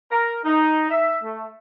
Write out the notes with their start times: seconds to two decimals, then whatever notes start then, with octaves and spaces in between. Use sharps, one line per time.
0.11 A#4
0.45 D#4
0.90 E5
1.24 A3